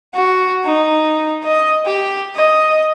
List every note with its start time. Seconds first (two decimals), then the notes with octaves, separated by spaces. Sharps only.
0.14 F#4
0.65 D#4
1.44 D#5
1.86 G4
2.35 D#5